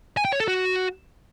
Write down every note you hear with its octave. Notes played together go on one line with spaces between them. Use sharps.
G#5
G5
C#5
A4
F#4